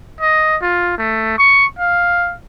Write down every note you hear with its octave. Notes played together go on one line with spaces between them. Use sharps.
D#5
F4
A3
C#6
F5